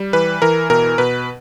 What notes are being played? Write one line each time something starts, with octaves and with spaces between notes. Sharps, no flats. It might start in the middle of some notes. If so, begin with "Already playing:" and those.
Already playing: G3
E3 B4
E3 A#4
B2 A#4
B2 B4